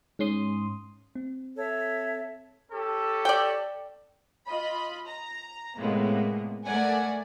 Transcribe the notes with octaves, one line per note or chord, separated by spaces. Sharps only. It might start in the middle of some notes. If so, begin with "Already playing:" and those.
G#2 C#4 C6 D#6
C4
A4 C#5 E5
C#4 G4 A4
D5 G5
F4 D#5 B5
A#5
A2 C3 G#3 A#3 B3
A3 A#4 D5 F#5 G#5